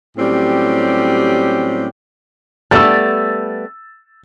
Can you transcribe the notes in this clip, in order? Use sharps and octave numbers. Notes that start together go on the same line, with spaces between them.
A2 F#3 G3 C4 C#4 G4
G3 A3 B3 E6 A6